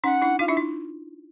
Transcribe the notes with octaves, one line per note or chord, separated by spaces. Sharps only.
C#4 D#4 F#5
D4 E4
D#4 F4 F5
D4 E4 E5
D#4